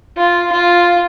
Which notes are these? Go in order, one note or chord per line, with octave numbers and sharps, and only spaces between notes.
F4
F4